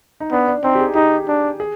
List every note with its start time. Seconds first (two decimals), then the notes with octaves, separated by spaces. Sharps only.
0.20 D#4
0.32 B3 D4
0.48 D4
0.64 C4 D#4
0.75 G4
0.80 G#4
0.95 D#4 G4
1.28 D4
1.60 G#4